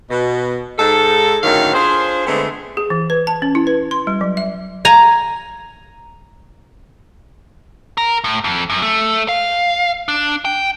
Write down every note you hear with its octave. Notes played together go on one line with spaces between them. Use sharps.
B2
G#2 A4
F#2 A2 D3 D#3 C#4 F5
D4 F4 G#4 C5
D3 G#3 A3 B3 C4
G#4
E3
B4
A5
C#4
E4
B4
C6
G3
F#3
E5
G#5 A#5
A#4
A2
F2
F#2
A3
F5
D4
G5